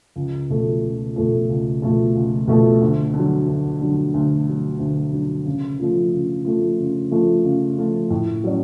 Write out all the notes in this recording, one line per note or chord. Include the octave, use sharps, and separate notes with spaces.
C#2
B2 A3 F4 A4
C#2
B2 A3 F4 A4
C#2
B2 A3 F4 A4
C#2
B2 A3 F4 A4
D2
D3
F#3
D2
D3 F#3
D2
D3 F#3
D2
D3 F#3
C#3
F3 A3 F4
C#3
F3 A3 F4
C#3
F3 A3 F4
C#3
F3 A3 F4
A2
F#3 C#4